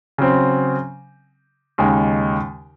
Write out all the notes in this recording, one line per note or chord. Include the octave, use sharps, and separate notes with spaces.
C#3 F#3 C4
D#2 C#3 G#3 D#4